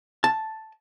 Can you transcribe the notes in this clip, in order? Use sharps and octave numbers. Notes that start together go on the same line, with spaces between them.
A5